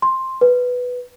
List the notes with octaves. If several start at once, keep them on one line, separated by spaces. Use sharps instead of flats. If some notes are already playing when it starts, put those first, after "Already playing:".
C6
B4